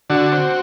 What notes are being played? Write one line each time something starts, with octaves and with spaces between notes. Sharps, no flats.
D3 F#4
C4